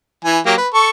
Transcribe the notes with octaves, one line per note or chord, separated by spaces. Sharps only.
E3 G#5
F#3 A#3 G4
B4
A4 C#6